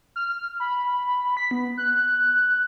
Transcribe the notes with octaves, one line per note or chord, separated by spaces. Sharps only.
F6
B5
B6
B3
F#6